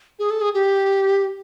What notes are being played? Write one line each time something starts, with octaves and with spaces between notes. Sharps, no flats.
G#4
A4
G#4
G4